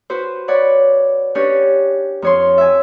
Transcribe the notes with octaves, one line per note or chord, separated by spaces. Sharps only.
F#4 B4 C5
C#5 D5 F#5 B5
C#4 D4 G4 B4 C#5
F2 C#5 C6
E5 G#5